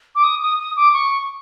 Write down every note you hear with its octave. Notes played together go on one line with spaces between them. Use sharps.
D6
D#6
D#6
D#6
D6
C#6